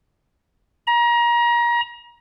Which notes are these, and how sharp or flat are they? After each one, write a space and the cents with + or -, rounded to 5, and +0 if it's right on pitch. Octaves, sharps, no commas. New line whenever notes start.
A#5 +30